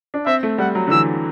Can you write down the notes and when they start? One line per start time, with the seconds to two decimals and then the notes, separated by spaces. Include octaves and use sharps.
0.14 D4
0.26 C4 E5
0.43 A3
0.58 G3 F#5
0.75 F#3
0.87 D3
0.91 E3 E6